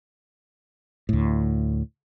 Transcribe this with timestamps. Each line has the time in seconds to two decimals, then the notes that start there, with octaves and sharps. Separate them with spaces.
1.09 D2 A2